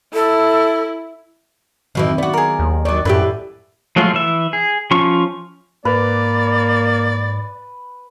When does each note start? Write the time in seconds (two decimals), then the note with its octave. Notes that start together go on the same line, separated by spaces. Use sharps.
0.14 E4 A4
1.95 F2 B2 D#3 E3 F#3
2.18 B3 F#4 D5
2.33 G#4 A#4
2.59 D#2
2.85 D#3 F#3 D5
3.05 F#2 A2 E4 G4 B4
3.96 F3 F#3 G#3 A3 F4
4.14 E3 E5
4.53 G#4
4.91 F3 C#4 F4 C#6
5.85 G#2 A#3 B4 D5